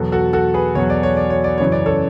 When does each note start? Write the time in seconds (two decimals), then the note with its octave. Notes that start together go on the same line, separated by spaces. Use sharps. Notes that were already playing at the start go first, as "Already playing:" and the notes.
Already playing: E2 B2 F#3 F#4 A4
0.12 F#4 A4
0.33 F#4 A4
0.54 G#4 B4
0.75 E2 B2 F#3 C#5
0.90 D5
1.03 C#5
1.17 D5
1.30 C#5
1.44 D5
1.58 F#2 C#3 E3 C#5
1.72 D5
1.86 A4 C#5